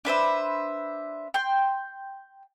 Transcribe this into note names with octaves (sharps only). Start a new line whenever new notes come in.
D4 B4 C5 E5
G5 C6